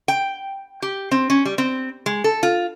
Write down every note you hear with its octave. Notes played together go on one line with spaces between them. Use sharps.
G5
G4
C4
C#4
G3
C4
G#3
A4
F4